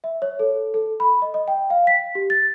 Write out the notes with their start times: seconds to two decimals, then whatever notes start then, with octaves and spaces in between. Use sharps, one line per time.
0.04 E5
0.22 C#5
0.39 A4
0.74 A4
1.00 B5
1.22 D#5
1.34 D#5
1.48 G5
1.70 F5
1.87 B6
2.15 G4
2.30 A6